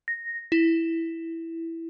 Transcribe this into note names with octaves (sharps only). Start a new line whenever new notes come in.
A#6
E4